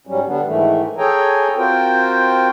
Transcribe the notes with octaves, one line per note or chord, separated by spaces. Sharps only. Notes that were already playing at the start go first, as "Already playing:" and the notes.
G#2 F#3 G3 C#4
D3 G3 B3 D4
G#2 D#3 E3 A3
G#4 A4 C#5 G5 G#5 A#5
C4 F4 F#4 A#4 C5 G5